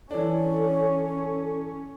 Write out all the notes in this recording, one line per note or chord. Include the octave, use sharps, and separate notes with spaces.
E3 C#4 D4 A4 C#5